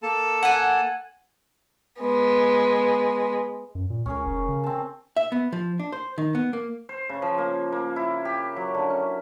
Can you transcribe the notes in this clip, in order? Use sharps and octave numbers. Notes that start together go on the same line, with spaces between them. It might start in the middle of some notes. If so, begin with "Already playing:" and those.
A#3 A4 A5
F#5 G#5
G#3 B3
F#2
A#2
C#2 C#4 G#4 A#4
F1
C#3
C4 A5
E5
B3
F3
D4
C5
D#3
B3
A#3
C5
C#3
F3
A#3
A#3
E4
G4
F#3
D3
C#4